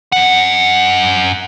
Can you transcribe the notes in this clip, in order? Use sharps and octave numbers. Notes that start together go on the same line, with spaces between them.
F#2 F#5